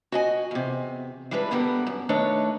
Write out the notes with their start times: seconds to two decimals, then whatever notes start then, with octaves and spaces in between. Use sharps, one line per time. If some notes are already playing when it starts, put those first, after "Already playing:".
0.12 F#4 D#5 G#5
0.51 E2 C3
1.31 E3 G3 G#3 D4 B4
1.51 D2 G2 D3 G3 B3 A#4
1.87 F#2
2.09 D#3 A3 D4 D#4 B4 C#5